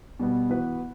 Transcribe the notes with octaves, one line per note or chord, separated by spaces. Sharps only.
B2 G3 B3
E3 B3 F#4 B4